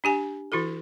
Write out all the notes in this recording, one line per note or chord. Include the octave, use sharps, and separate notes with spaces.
D4 G4 G#5
E3 E4 F#4 A4